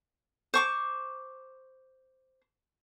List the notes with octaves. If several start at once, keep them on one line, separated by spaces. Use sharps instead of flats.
C5 C#6 D6